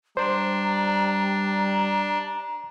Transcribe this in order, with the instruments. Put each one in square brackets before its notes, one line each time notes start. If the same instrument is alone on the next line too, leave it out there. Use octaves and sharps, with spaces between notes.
[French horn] G3 [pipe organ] D4 [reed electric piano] C5 [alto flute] A#5